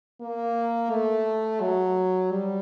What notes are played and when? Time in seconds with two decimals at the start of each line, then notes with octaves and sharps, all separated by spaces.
0.21 A#3
0.91 A3
1.60 F#3
2.31 G3